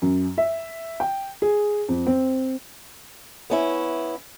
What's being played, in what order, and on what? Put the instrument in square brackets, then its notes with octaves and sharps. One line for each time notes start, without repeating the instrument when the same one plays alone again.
[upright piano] F#2
E5
G5
G#4
F2
C4
[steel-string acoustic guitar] B3 C#4 E4